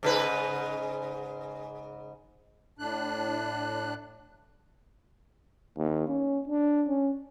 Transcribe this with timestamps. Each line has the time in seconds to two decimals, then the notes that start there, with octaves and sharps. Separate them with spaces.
0.03 G#2 C#3 B4
2.79 A2 D4 F#6
5.78 D#2
6.08 C#4
6.48 D4
6.88 C#4